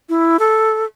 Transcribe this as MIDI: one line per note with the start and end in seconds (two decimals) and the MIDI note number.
0.09 0.37 64
0.39 0.85 69